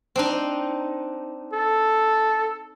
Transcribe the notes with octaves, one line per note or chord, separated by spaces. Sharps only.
C4 D4 D#4
A4